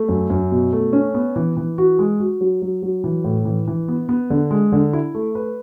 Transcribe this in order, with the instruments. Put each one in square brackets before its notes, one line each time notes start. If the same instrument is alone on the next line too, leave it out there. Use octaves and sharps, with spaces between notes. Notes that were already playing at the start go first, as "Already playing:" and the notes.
Already playing: [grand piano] A3
F#2
F#2
B2
A3
C#4
B3
E3
E3
F#4
G#3
F#4
F#3
F#3
F#3
E3
A2
E3
E3
B3
B3
D3
G#3
D3
E4
A3
B4